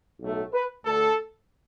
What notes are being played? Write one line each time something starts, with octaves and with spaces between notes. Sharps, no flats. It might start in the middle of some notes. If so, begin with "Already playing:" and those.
B1 A2 F#3 A3
B4
D2 D3 A3 A4